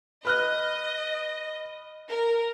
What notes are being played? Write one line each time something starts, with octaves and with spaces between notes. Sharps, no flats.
B4 D#5 F6 F#6
A#4